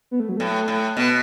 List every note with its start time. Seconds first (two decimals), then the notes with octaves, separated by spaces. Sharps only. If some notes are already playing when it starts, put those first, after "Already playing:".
0.11 B3
0.20 A3
0.29 F#3
0.37 A2 A3
0.68 A2
0.96 B2 B3